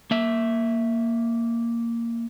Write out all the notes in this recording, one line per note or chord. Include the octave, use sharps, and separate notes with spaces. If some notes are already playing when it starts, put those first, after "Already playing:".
A#3 E5